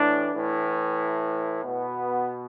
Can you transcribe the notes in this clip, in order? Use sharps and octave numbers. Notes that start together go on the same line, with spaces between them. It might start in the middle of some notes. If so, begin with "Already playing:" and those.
Already playing: A2 E3 D4
A2 E3
B2 B3